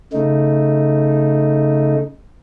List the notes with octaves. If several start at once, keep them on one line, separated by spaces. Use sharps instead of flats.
C#3 A3 D#4